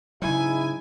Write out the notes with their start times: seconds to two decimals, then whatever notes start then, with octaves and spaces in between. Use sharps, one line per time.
0.22 G#2 C#3 F#3 D#4 E4 G#5